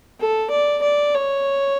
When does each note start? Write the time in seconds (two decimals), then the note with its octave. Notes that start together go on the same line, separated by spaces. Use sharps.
0.20 A4
0.51 D5
0.83 D5
1.15 C#5